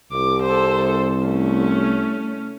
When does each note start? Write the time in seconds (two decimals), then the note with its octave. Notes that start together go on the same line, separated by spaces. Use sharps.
0.12 C2 D6
0.43 A4 C5
1.26 A3 C#4